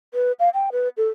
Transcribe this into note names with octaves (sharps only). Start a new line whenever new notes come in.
B4
F5
G5
B4
A4